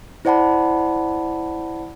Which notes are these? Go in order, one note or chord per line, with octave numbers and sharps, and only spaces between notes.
E4 C5 D5 F#5 A5 B5